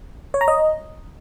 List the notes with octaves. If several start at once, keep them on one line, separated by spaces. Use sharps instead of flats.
C#5
A#5
D#5